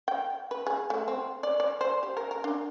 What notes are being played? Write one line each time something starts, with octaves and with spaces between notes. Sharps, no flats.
G5
B4
G#4
A3
C4
D5
D5
C5
G4
A#4
A#4
D4